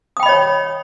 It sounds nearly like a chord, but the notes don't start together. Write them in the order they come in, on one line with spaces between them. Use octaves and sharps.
D#6 G5 B5 D#5 C#5